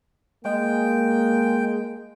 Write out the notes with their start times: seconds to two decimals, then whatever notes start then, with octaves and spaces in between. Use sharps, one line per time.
0.45 G#3 A#3 G5